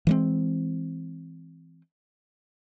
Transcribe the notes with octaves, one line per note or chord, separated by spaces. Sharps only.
E3 G#3 C4